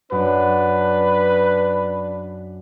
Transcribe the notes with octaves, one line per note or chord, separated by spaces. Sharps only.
F#2 D4 B4